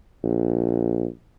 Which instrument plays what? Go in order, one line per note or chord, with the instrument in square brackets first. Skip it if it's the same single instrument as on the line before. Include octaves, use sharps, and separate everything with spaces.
[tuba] A#1